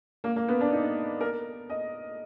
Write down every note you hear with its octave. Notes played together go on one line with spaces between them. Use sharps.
A#3
A#3
B3
D4
D#4
A#4
D#5